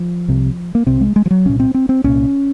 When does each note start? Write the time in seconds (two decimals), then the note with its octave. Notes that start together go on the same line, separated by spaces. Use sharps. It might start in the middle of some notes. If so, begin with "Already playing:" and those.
Already playing: F3
0.28 C2 C3
0.75 A#3
0.86 C2 C3 C4
1.01 G#3
1.16 G#3
1.26 F3
1.31 F#3
1.46 C2 A#2 C#4
1.60 C4
1.74 C4
1.89 C4
2.04 C2 A#2 C#4